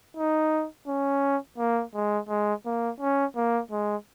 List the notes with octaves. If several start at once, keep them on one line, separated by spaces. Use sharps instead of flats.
D#4
C#4
A#3
G#3
G#3
A#3
C#4
A#3
G#3